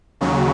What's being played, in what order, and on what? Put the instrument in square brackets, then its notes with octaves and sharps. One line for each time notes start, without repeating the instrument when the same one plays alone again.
[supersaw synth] D#2 C#3 F#3